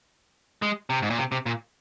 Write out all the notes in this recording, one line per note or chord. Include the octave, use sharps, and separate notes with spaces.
G#3
C3
G#2
A#2
C3
C3
A#2